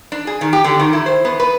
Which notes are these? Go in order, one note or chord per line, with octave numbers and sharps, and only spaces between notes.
D4
G#4
D#3
G4
D3
D#3
E4
C5
B3
B4